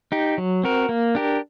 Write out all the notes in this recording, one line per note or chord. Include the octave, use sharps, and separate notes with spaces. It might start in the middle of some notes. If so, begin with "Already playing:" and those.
D#4 G4
F#3
C4 F#4 A#4
A#3
D4 G4 A#4